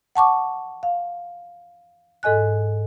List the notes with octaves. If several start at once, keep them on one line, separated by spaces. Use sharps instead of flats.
F#5 A5 C#6 D6
F5
G#2 A4 D#5 G#5 F#6